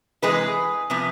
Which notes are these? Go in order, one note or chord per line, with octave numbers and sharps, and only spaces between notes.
C3 E3 G#3 G#4 B4
C3 F3 B3